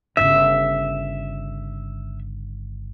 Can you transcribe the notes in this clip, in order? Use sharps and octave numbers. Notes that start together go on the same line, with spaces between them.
G1 C#3 E5